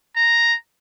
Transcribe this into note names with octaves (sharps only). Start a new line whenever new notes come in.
A#5